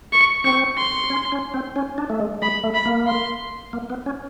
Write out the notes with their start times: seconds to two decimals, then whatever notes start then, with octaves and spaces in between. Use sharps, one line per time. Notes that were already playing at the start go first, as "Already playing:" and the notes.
0.12 C#6
0.44 C4 C#6
0.77 C6
1.10 C#4
1.32 C#4
1.54 C4
1.76 C#4
1.98 D4
2.10 A3
2.20 G#3
2.42 G#3 B5
2.63 A3
2.75 B5
2.85 A#3
3.07 C6
3.73 A#3
3.90 B3
4.06 C#4